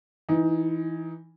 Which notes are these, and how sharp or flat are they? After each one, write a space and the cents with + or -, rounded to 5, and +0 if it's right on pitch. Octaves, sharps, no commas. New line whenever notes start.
E3 +0 D#4 +20